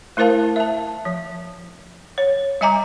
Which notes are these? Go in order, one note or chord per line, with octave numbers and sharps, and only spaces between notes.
A3 E4 A#4 C5 F5 A5
E5 A5
F3
C#5
G3 D#5 G#5 A#5 D6